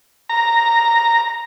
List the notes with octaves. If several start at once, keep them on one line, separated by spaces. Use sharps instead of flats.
A#5